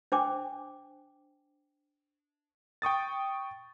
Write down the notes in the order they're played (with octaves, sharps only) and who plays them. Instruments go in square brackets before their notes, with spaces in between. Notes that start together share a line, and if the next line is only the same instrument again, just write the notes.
[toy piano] D4 C5 G5 G#5 D6
[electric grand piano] G5 C#6 D#6 A6